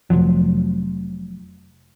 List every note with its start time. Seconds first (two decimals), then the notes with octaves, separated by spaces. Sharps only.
0.10 F1 D#2 F3 F#3